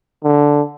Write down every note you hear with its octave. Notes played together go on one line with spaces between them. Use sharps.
D3